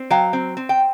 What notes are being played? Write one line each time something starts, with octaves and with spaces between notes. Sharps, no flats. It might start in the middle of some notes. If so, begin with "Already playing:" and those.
Already playing: C4
F#3 F5 G5
C4
C4
G5